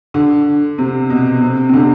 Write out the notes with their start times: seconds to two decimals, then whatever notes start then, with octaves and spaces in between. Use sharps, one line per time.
0.14 D3
0.78 C3
1.10 B2
1.42 C3
1.69 C3
1.74 D3